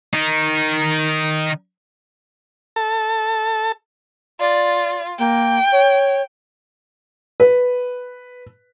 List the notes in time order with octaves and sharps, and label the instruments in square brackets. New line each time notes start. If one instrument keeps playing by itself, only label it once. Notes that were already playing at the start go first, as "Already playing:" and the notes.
[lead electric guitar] D#3 D#4
[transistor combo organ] A4 A5
[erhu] F4 [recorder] D5
[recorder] A#3 [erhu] G5
[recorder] C#5
[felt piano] B4